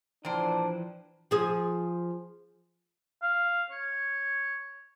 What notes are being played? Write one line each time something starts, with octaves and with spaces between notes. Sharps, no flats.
A#2 E3 F3 D4 C5 G5
F3 G#4
F5
C#5